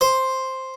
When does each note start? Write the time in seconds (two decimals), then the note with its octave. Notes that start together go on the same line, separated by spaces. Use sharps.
0.01 C5